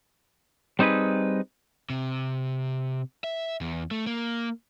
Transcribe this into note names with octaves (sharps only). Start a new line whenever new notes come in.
G3 C4 D#4 G#4 B4
C3
E5
E2
A3
A#3